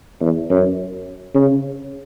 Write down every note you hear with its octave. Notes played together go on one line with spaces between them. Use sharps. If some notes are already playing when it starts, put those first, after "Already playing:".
E2
F#2
C#3